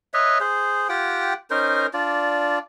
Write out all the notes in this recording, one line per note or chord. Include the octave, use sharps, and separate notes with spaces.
B4 C#5 D#5 E5
G#4 C5
F4 G4 F#5 G5
C#4 D#4 A#4 C5
D4 F4 D5